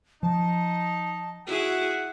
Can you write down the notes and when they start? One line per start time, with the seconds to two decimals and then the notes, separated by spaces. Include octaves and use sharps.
0.23 F3 D#4 A5
1.47 E4 F#4 G#4 F#5